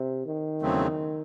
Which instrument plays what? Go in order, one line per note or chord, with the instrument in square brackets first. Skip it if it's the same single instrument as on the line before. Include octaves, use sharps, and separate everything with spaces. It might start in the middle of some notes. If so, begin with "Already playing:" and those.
Already playing: [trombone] C3
D#3
[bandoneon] E2 C#3 F#3 A3 C4